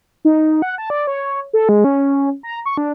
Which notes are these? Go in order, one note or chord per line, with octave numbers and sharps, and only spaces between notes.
D#4
F#5
A5
D5
C#5
A4
G#3
C#4
A#5
C#6
D4